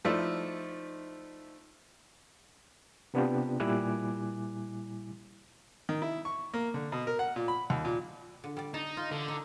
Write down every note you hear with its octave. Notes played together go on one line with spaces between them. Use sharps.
F3 A3 D#4 E4 C5 D5
C3 B3 D4 F4 G4
A#2 G3 E4 G#5 D6 F#6
D#3
E4
C#6
A#3
D3
B2
A#4
F#5
A#2
B5
D#2
A#2
D3
G3 D5
D#4 A5
F4
D3
D#4